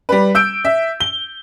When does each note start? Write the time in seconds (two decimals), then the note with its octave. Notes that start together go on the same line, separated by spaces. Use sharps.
0.09 G3 B4
0.35 E6 G6 D7
0.65 E5
1.00 G7